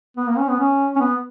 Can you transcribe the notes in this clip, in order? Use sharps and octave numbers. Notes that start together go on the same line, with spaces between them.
B3
A#3
C#4
B3
C#4
C#4
B3